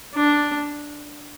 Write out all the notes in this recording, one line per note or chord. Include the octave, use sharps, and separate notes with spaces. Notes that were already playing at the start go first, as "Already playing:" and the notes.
D4